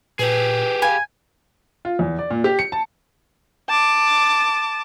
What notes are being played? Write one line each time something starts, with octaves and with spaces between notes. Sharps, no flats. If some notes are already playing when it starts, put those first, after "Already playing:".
A#2 G4 G#4 B4
F5 G#5 B5
F4
E2
D5
A#2
G4
C#7
A5
A5 D6